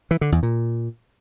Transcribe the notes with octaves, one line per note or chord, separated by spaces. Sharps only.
E3
D3
E2
A#2